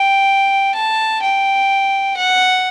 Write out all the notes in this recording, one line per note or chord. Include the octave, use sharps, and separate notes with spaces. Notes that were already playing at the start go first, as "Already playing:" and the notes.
Already playing: G5
A5
G5
F#5